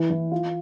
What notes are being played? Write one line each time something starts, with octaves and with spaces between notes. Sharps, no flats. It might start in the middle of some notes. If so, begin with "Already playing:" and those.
Already playing: E3
E3
F4